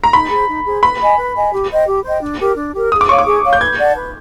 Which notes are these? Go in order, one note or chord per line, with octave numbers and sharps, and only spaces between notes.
A#5
D#4 B5
G#4 C5
D#4
G#4 C5
B4 B5
D#5 G#5
B4
D#5 G#5
G4
C5 D#5 G5
G4
C5 D#5 G5
D4
G4 A#4
D4
G4 A#4
G#4 D#6
D6
C#5 F5 C#6
D6
G#4
C#5 F5
G6
B4 G#6
D5 F#5 A5
B4